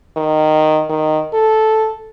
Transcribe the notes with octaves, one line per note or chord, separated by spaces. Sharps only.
D#3
D#3
A4